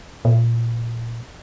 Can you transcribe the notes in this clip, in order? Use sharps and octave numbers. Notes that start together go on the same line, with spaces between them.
A#2